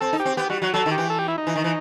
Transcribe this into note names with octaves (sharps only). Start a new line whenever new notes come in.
C4 A4
D#4
G4
C4
B3 G4
G3 F#4
F#3 F#4
F#3 A4
D#3
G4
E3
A4
G4
E4
D#4
E3
D#3
E3